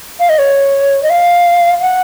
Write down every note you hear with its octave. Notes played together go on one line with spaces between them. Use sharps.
F5
D#5
C#5
D#5
F5
F#5